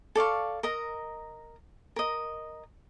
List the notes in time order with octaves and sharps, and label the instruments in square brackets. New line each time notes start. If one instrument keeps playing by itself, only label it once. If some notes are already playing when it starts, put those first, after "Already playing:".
[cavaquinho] A4 D5 F5 C#6
A#4 D#5 A#5
A#4 D#5